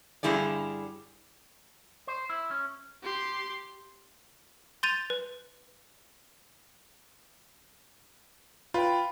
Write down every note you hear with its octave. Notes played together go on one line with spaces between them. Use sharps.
G2 D3 G3 E4 G#4 D5
C5
E4
C#4
G4 C6
C6 G6 A6 D#7 F7
B4
F4 B4 G5